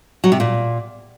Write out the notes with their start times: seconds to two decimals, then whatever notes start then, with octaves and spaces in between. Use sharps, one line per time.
0.24 F#3
0.32 C3
0.40 A#2